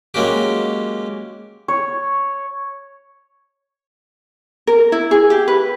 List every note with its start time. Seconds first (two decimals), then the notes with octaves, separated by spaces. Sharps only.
0.14 F#3 G#3 A#3 C#4 F#4 G4
1.68 C#5
4.67 A#4
4.92 E4
5.11 G#4
5.30 G4
5.48 B4